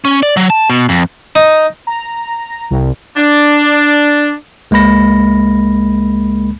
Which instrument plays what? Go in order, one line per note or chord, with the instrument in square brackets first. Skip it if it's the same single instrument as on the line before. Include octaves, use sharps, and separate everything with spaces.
[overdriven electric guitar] C#4
D5
F#3
A5
B2
F2
[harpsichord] D#4
[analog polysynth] A#5
C2
[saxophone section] D4
[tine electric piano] C#2 G#3 A#3 B5 A#6